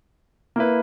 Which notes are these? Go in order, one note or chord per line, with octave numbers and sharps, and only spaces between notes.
A#3 E4 B4